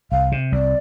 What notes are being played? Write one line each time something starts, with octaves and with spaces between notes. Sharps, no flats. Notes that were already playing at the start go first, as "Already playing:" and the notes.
C2 F5
C3
C2 D5